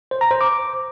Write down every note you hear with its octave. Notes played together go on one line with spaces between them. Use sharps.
C5
A#5
C5
D6